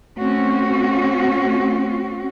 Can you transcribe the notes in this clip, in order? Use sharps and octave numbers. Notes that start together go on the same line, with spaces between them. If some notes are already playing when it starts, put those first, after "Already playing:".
A3 C4 C#4 F#4